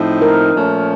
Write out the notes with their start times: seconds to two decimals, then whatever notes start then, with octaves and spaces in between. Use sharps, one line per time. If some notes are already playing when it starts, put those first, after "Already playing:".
Already playing: A2 F3 C4 D#4
0.22 A#4
0.54 A#2 F3 A3 C#4